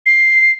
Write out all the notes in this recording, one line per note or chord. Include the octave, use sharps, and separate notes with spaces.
C7